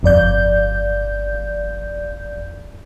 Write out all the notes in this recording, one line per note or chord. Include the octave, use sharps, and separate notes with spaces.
G1 F2 D5 G6